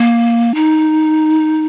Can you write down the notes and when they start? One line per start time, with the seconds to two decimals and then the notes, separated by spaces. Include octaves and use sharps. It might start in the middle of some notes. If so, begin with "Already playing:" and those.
Already playing: A#3
0.55 D#4